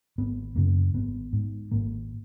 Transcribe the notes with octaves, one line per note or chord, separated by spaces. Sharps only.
G#1 B3
F#2 C#3 A#3
G#1 B3
G#2
G#1 A#3